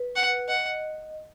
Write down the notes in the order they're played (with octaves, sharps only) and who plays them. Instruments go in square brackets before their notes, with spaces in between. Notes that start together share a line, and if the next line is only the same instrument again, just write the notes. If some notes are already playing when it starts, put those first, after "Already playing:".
Already playing: [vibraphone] B4
[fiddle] F#5
[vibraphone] D#5 [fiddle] F#5